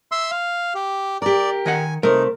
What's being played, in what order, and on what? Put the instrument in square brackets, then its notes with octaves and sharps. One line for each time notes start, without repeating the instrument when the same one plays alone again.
[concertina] E5 C6 E6
F5
G4
[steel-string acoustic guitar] G4 A#4 [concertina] D5
[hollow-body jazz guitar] D#3 D#5 F#5 [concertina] G#5
[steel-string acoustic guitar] C3 A3 [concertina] D#4 [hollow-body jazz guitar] A#4